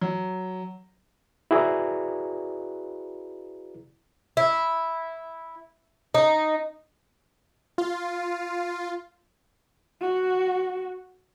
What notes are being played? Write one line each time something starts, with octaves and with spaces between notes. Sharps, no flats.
F#3
E4 F#4 G#4 B4 D5 A#5
E4
D#4
F4
F#4